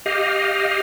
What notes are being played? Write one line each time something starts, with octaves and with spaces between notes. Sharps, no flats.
G4 D#5 F5